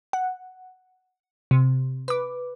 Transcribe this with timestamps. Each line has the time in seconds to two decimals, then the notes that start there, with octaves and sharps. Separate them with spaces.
0.13 F#5
1.51 C3
2.08 B4 D6